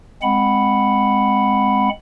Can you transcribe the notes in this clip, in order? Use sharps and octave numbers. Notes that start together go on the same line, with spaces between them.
G#3 C4 F#5 B5